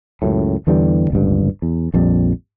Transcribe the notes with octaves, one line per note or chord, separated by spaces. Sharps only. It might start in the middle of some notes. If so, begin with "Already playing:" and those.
C#2 F#2 A2
E2 D3 E3 G3
D1 G1 C#2 G2
E2
A#1 F2 G3